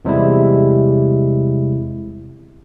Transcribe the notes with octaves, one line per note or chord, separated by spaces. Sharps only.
E2 C3 G3 G#3 E4